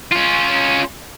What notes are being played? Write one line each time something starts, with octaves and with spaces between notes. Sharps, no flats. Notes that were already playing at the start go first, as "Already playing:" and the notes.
C#4 F4